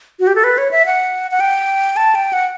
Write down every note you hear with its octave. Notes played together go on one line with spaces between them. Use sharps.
F#4
G4
A4
B4
C#5
E5
F#5
F#5
G5
A5
G5
F#5